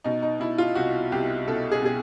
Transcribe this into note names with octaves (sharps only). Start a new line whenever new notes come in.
B2 D#4
D#4
B2 E4
F4
C2 F#4
C2 G4
B2 A4
G#4
B2 G#4